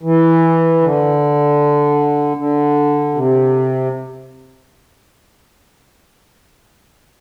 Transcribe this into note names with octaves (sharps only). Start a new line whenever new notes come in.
E3
D3
D3
C3